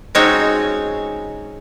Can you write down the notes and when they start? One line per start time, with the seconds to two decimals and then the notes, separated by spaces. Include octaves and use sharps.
0.15 G#3 C4 C#4 D#4 F#4 C#5